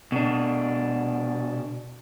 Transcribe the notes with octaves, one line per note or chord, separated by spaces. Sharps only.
B2 D4